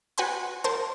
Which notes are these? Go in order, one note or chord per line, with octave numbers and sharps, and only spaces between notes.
F#4 B4 G5 G#5 B5 C6
A#4 C5 A5